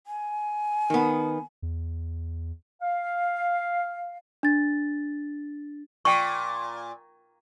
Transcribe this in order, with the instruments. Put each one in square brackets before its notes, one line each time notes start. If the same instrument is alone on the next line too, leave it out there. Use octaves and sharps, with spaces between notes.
[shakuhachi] G#5
[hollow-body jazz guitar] D#3 B3
[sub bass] E2
[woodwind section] F5
[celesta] D4 A6
[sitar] A#2 [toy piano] G5 C#6